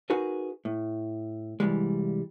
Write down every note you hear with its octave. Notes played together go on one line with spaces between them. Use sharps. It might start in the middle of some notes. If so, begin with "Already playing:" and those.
D#4 F#4 G#4 A#4 B4
A2
C2 E3 G3 G#3